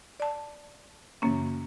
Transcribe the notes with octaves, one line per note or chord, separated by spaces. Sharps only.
D5 A5
F#2 C#3 E3 A#3 C#4